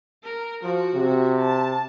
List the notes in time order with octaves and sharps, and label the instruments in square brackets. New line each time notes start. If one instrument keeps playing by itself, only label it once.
[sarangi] A#4
[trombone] F3 [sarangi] F#4
[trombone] C3
[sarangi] A5